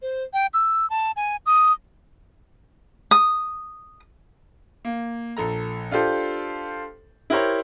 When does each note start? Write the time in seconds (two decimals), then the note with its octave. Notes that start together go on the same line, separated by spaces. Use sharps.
0.02 C5
0.34 G5
0.54 E6
0.90 A5
1.16 G#5
1.46 D#6
3.11 D#6
4.85 A#3
5.37 A#1 A4 A#5
5.91 D4 F4 G4 A4 C5
7.30 E4 G4 A#4 C5 C#5